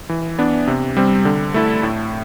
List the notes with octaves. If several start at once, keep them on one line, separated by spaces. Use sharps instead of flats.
E3
B3 D4
C3
G3 C4
D3
A3 E4 A4
A2